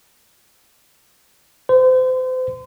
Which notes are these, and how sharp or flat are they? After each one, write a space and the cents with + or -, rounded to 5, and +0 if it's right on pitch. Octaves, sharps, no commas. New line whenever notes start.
C5 -35